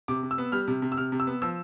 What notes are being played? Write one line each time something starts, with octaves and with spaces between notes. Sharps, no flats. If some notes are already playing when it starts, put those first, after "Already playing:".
C3 D6
C3
E6
B3
G3 F6
C3
C3
E6
C3 F6
C3
E6
B3
F3 E6